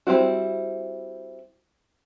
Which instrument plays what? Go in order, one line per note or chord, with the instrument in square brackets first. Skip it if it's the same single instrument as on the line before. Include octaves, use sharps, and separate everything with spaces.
[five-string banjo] G3 C4 E4 F#4